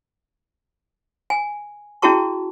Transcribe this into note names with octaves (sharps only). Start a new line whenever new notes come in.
G#5
C#4 E4 F#4 G#4 A5 C#6